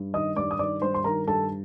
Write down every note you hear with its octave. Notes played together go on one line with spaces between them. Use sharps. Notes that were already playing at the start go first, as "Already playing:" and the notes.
Already playing: G2
D#3 D#5 D#6
G2 D5 D6
D#6
D#3 D5 D6
G2 C5 C6
C6
D#3 A#4 A#5
G2 A4 A5